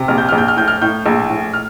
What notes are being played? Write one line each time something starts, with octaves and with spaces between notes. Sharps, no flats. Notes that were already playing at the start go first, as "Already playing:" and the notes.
Already playing: C3
A#1 F6
G6
A#1 F6
G6
F6
A2 G6
F6
A2 G6
A#1
A2
F6